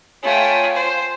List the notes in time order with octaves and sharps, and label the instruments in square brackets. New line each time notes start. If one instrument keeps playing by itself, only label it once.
[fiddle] A3 G5 [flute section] F4 C#5 G#5
[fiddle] C5